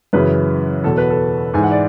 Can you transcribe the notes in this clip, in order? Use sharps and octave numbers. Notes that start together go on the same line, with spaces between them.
F#2 C#3 E3 B4
E2 B2 A4
B4
A4
G#2 E3 G#5
F#5
D5